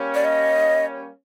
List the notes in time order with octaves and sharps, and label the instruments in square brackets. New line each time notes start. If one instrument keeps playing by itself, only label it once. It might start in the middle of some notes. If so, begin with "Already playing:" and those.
Already playing: [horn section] G3 A#3 C#4
[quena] D5
D#5